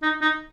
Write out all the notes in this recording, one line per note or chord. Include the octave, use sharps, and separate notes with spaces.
D#4
D#4